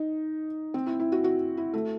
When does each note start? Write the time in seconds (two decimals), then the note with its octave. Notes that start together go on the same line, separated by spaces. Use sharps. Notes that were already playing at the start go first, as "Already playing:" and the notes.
Already playing: D#4
0.74 C4
0.86 E4
1.00 E4
1.12 F#4
1.24 F#4
1.57 E4
1.74 A3